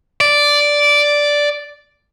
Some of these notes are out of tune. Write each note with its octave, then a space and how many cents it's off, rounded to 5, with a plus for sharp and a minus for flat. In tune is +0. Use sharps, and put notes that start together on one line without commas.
D5 -5